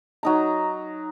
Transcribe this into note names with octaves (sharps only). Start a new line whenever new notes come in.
F#3 D#4 A#5